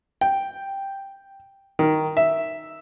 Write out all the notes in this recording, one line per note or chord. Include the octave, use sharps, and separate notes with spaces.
G5
D#3
E5